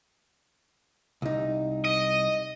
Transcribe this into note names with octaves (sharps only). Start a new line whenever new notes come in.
C2 D#4
D#5